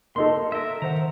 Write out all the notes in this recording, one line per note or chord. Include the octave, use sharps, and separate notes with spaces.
A#3 D#4 A4 C6
A#4 E5
D#3 C5 F#5 A#5